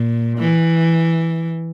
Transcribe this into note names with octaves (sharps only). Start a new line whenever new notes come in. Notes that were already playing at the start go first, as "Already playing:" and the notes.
Already playing: A#2
E3